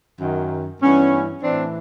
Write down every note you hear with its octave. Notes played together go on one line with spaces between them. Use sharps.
F#2 D#3
G2 E3 B3 C#4
A2 E3 C4 D4